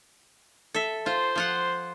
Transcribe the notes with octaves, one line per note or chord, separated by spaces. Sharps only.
A4 E5
F4 C5
F3 F4 F#5